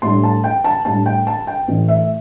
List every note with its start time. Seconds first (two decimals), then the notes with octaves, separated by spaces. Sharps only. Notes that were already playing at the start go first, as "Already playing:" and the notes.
0.02 A2 G3 D4 C6
0.24 A5
0.44 G5
0.64 A5
0.85 A2 G3 D4 A5
1.06 G5
1.27 A5
1.47 G5
1.68 A1 A2 E3
1.88 E5